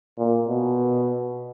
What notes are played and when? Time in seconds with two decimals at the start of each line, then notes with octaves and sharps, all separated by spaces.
0.18 A#2
0.48 B2